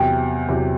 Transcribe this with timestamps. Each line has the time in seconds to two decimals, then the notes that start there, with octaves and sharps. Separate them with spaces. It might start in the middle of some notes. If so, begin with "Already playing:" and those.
Already playing: E2 C3 F#3 G5
0.48 E2 C3 F#3